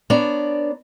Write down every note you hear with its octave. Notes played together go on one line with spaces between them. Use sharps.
B3 D4 C#5 D5 A#5